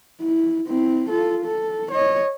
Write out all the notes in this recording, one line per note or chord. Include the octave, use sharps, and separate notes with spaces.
E4
C4 E4
F4 A4
A4
C#5 D#5